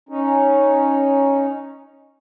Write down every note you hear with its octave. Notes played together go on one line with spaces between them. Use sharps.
C#4 D#4